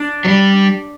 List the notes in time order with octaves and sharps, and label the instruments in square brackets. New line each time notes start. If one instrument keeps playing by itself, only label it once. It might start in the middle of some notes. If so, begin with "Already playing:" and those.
Already playing: [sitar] D4
[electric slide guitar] F#3
G3